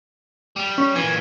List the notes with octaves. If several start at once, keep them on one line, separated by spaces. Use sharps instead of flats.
G3
C#4
A#2 E3 G#6